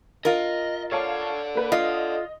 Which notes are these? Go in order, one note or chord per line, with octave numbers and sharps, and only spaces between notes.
F4 A#4 D#5
A4 C#5 D5 F5 A5
A#3 B4
F4 D#5